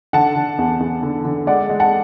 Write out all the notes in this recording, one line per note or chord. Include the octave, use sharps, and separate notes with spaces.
D3 F#5 A5
D3
E2
E2
D3
D3
G#3 D5 F#5
G#3
F#5 A5